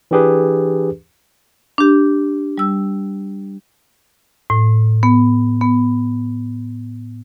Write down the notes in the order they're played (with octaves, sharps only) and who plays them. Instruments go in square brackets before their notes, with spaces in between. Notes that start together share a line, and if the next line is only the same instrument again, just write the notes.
[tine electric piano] E3 D4 G4 G#4 B4
[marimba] D4 G4
G3 E6
A2
B3
B3